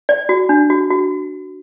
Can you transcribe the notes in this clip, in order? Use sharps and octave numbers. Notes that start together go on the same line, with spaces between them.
D5
F#4
D4
F#4
F#4